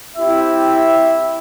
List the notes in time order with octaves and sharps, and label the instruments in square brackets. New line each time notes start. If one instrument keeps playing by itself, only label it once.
[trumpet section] C4 E4 G4 E5